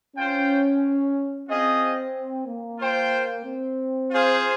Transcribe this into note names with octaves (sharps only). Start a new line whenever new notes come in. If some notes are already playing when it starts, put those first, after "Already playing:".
C#4 F4 C5 G5
C4 F4 G#4 D#5 G5
A#3
F4 C5 G5
C4
F4 G#4 C5 F5